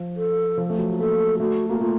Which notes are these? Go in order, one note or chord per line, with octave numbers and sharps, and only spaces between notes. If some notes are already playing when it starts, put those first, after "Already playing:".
Already playing: F3
A4
F3
A3
F#3
F#4
A#3 A4
A3 F#4
A#3 F#4
A3 F4